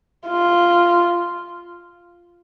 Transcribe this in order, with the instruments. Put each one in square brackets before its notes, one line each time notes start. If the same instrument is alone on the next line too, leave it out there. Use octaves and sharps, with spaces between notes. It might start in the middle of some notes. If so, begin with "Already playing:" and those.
[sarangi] F4